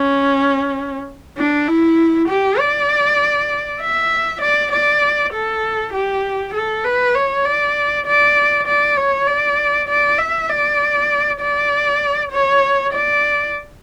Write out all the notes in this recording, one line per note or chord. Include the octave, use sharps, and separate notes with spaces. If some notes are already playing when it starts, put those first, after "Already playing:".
Already playing: C#4
D4
E4
G4
D5
E5
D5
D5
A4
G4
A4
B4
C#5
D5
D5
D5
C#5
D5
D5
E5
D5
D5
C#5
D5